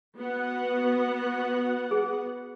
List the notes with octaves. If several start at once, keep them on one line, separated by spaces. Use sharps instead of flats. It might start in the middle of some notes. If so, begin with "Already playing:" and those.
B3 F#4 F#5
G#4